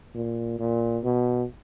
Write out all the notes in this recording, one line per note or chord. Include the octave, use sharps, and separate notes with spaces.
A#2
A#2
B2